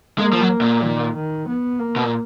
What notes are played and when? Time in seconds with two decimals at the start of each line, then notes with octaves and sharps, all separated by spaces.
0.18 G#3 A#3
0.33 F3
0.41 F#3
0.61 A#2
0.83 D#3
1.15 D#3
1.48 B3
1.79 A#3
1.96 B2
2.04 A#2